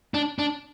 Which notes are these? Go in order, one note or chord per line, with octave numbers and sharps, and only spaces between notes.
D4
D4